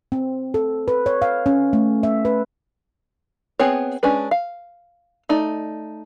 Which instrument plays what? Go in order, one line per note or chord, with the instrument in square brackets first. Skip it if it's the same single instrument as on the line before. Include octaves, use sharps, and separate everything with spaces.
[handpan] C4
A4
B4
C#5
F5
C#4
A3
E5
B4
[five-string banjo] B3 C4 G#4 C#5
G#3 C#4 D4 B4
F5
A3 D#4 D5